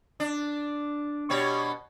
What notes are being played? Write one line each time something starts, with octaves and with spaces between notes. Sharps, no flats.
D4
B2 G3 C#5